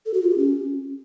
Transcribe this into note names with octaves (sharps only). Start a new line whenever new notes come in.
A4
F#4
F4
G4
C#4